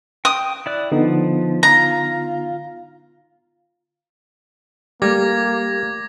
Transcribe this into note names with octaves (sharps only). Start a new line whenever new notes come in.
G5 D#6
E4 D5 F#6
D3 F3 B3 D#4
F4 A#5
G3 A3 A#3 G4 D6 G#6 A#6